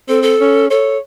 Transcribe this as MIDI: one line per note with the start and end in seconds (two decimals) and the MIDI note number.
0.09 0.35 60
0.09 0.22 69
0.22 0.66 69
0.41 0.69 61
0.70 0.97 69
0.70 0.99 73